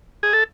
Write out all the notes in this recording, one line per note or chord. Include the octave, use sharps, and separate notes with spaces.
G#4
A4